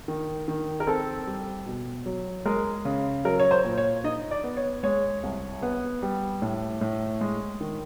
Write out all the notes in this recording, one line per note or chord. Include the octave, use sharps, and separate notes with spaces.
D#3
D#3
A#4
C4 A4
G3
B2
F#3
G#3 A#4
C#3
F#3 A#4
C#5
C5
A#2
C#5
D#4 D#5
D5
B3
C#5
G#3 C#5
C2
B3
G3
A2
A2
G#3
D#3